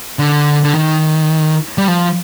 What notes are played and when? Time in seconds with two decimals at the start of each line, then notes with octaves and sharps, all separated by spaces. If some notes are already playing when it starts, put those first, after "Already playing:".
0.19 D3
0.64 D3
0.75 D#3
1.78 G3
1.88 F3